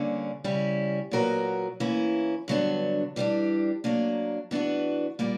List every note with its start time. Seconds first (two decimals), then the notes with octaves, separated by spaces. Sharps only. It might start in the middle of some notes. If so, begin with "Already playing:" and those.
Already playing: G2 D3 A#3 C#4
0.44 C#3 G3 C#4 E4
1.11 A#2 F#3 B3 F#4 A#4
1.80 E3 A#3 C#4 E4
2.48 G2 D3 F#3 B3 D4
3.16 E3 G3 B3 D4
3.84 F#3 A#3 D4
4.51 E3 B3 D4 F#4
5.19 A#2 G3 A#3